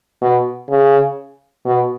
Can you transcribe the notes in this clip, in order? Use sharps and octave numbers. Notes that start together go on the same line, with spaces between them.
B2
C#3
B2